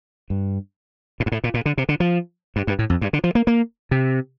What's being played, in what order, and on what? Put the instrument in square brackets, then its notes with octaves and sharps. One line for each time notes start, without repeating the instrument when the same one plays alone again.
[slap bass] G2
A2
G2
A2
A#2
A#2
D3
C3
D3
F3
G2
G2
A2
F2
G2
D3
F3
A#3
A#3
C3